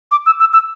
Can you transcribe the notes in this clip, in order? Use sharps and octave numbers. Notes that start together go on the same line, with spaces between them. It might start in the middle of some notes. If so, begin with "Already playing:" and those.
D6
E6
E6
E6